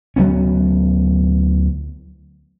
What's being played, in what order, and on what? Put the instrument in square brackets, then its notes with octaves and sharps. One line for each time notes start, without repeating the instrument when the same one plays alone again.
[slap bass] D2 F#3 B3 C#4